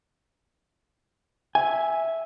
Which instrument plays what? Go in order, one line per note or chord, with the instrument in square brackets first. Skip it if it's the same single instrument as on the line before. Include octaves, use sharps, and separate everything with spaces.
[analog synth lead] E5 [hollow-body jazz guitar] G#5